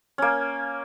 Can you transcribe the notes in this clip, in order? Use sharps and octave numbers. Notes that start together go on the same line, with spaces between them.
A#3 C#4